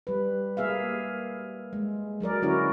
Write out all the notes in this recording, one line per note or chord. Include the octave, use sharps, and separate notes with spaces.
G3 B4
A#3 G#4 E5 F5
G#3
F#3 G#4 A#4 D5
D3 C#4 E4 F#4 A#4